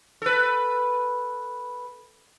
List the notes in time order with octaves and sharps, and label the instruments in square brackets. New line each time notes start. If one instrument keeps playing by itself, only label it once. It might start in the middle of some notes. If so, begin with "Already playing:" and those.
[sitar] A4 B4